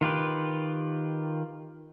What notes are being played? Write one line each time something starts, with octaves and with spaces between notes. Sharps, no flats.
D#3 F4 G4 B4